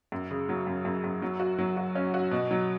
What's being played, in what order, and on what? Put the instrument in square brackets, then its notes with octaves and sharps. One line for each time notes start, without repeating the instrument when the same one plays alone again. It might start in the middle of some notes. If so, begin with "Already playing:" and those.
[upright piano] F#2
C#3
F#3
F#2
F#2
F#2
F#3
F#4
F#3
F#4
C#4
F#4
B2
F#3